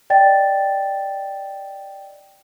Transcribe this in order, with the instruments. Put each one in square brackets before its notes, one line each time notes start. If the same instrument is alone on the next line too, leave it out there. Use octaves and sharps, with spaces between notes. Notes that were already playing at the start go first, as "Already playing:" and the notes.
[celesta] D5 D#5 G5 A6